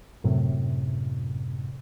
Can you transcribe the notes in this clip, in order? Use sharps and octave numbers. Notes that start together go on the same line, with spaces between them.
F#2 A2 C3